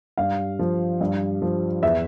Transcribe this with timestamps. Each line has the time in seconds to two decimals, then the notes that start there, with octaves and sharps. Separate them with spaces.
0.18 G2 F5
0.59 F3
1.01 G2
1.42 F3
1.82 E2 E5